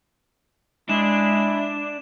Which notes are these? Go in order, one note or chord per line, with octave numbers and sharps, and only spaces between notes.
G#3 D4 E4 E7